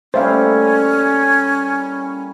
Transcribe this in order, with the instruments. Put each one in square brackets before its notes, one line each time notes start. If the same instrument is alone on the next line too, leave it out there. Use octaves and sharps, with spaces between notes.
[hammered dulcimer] A2 G3 A#3 [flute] C#4 [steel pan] C5 E5 F5